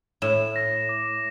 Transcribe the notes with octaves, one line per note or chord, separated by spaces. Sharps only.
A2 E7
A#6
D6